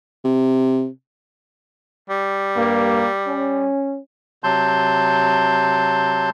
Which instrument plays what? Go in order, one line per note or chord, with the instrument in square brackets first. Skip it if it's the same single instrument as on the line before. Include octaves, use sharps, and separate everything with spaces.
[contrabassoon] C3
[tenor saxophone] G3
[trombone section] G2 A#3
C#4
[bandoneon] C3 F#3 A5 C6 G6